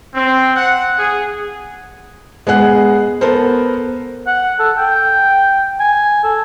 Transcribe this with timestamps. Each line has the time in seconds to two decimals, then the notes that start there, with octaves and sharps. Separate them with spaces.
0.15 C4
0.56 F#5
0.98 G#4
2.47 G#3 B3 G#4 F#5 F#6
3.21 B3 A4 A#4 C5
4.27 F#5
4.60 A4
4.78 G5
5.80 G#5
6.24 A4